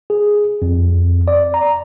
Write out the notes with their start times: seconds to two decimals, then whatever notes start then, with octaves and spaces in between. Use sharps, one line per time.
0.10 G#4
0.62 F2
1.28 D5
1.54 A#5